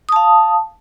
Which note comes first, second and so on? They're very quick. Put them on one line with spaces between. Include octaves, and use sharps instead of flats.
D#6 A5 F5